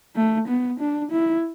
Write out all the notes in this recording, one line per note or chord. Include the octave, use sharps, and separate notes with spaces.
A3
B3
D4
E4